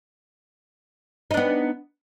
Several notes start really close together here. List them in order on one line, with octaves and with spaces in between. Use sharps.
D#4 D4 B3